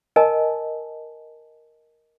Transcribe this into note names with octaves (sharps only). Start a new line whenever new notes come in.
A#4 D#5 G#5 A5